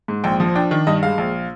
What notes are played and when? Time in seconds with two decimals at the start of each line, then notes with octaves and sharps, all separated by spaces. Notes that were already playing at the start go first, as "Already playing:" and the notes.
0.08 G#2
0.24 A#1 G5
0.40 F3
0.55 D4 G5
0.71 D#3
0.87 G2 D#5
1.03 G#3 F5
1.18 A#1